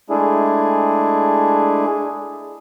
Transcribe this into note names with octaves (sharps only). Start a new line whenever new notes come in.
G#3 A3 D4 E4 G#4